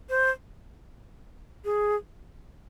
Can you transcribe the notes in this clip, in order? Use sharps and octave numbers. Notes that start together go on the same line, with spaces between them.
C5
G#4